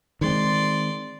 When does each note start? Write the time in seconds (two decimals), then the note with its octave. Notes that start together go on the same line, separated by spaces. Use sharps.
0.21 D#3 G#3 C4 D5 C6